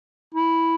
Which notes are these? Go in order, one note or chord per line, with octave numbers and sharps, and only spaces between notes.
E4